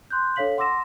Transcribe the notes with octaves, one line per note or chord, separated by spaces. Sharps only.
C6 F#6 G6
D4 A4 C#5 F5 B6 F#7
F#5 C6 D6 E6 A#6 E7